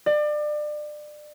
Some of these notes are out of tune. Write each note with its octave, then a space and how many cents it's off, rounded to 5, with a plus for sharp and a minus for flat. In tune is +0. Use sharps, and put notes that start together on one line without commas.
D5 +30